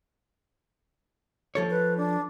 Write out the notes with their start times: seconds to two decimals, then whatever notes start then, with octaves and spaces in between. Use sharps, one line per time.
1.55 F3 A4 C#5
1.70 B4
1.97 D4